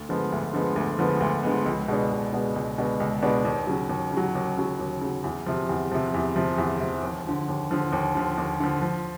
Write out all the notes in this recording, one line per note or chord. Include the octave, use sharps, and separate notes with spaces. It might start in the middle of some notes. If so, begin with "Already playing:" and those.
Already playing: D2
D3 F3 G#3 B3
D2
D3 F3 G#3 B3
D2
D3 F3 G#3 B3
D2
D3 F3 G#3 B3
C#2
B2 G#3 B3 D4
C#2
B2 G#3 B3 D4
C#2
B2 G#3 B3 D4
C#2
B2 G#3 B3 D4
D#2
C#3 F#3
D#2
C#3 F#3
D#2
C#3 F#3
D#2
C#3 F#3
E2
C3 F3
E2
C3 F3
E2
C3 F3
E2
C3 F3
D#2
D3 F3
D#2
D3 F3
D#2
D3 F3
D#2
D3 F3
F3